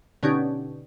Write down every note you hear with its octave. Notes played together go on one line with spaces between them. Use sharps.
B2 D3 C#4 D#4 G4